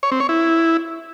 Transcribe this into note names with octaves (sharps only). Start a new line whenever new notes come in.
C#5
C4
C#5
E4